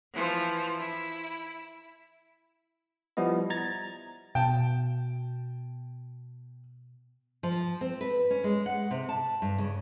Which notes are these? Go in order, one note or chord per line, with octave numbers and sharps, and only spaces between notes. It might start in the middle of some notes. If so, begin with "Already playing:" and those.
E3 F3
E4
F3 G3 B3 E4 D#5
A#5 G#6 A6
B2 G5 A5
F3
C4
B4
C#4
G#3
F#5
C3
A5
G2
C#3